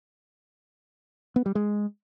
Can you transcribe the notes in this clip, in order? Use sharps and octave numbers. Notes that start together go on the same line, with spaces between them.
B3
G3
G#3